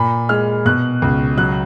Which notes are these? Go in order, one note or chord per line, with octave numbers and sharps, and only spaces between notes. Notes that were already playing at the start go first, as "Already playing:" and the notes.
Already playing: A#2 B5
G#3 F6
B2 F#6
C#2
F#3 F#6